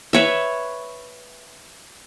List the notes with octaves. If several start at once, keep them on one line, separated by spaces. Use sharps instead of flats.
B4 C#5 E5